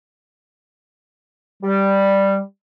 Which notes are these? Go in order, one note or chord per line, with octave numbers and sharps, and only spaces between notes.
G3